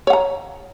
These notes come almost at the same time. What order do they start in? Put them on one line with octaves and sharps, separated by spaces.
C#5 F#5 A#5